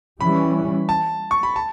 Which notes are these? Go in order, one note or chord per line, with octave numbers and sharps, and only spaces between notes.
E3 G3 C#4 B5
A5
C#6
B5
A5